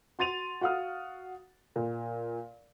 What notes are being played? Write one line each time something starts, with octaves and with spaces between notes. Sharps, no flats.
F#4 C6 A6 D#7 F7
F#4 F5 F#5 D#6 F6
A#2